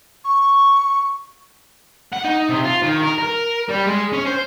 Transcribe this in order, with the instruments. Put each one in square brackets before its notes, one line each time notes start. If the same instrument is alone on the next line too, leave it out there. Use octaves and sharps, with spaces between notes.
[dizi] C#6
[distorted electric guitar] F#5
D#4
C3
F4
D#3
A#4
A#4
G3
G#3
C#4
C5